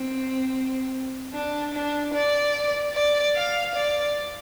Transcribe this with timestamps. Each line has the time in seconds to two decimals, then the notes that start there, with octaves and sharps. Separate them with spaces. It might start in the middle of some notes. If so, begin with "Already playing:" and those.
Already playing: C4
1.33 D4
1.74 D4
2.14 D5
2.95 D5
3.35 F5
3.75 D5